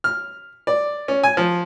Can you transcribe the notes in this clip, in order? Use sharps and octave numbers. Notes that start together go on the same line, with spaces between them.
F6
D5
C#4
G#5
F3